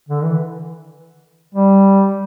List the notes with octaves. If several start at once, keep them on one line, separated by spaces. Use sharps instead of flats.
D3
E3
G3